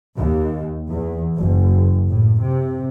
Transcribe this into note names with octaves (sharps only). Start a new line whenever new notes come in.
D#2
E2
F#1
A2
C3